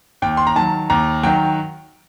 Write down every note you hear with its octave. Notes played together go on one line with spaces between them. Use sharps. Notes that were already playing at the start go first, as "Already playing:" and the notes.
D#2 G5
C6
A#5
D#3 F#3 A5
D#2 A#5
D#3 F#3 G5